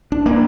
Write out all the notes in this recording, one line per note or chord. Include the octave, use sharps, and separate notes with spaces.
D4
A#3 D4